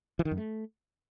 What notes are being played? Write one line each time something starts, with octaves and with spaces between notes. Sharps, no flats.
E3
D#3
F#2
A3